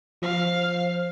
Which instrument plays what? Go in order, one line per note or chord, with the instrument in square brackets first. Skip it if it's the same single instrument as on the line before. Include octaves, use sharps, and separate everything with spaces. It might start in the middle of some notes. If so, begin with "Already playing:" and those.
[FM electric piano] F3 [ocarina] C5 [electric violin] F5